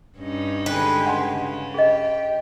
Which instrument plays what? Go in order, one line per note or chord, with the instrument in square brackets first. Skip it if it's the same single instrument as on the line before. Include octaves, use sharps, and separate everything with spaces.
[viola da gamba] G2 C#4 D#4
[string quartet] D3 G#3 G4 [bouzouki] B4
[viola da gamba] C#3 C#4 [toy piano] F#5 G#5 C6
[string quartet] G4 [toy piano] G#4 D#5